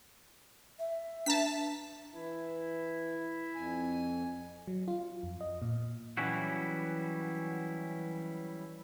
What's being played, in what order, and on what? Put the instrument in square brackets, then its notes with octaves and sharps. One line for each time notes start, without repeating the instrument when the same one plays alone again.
[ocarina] E5
[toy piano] D4 B4 A#5 [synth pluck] A5 B6
[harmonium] E3 [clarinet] E4
[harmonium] F2 G#5
[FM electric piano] F#3
F4
F2
D#5
A#2
[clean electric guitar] E3 F#3 G3 C#4 E4 F#4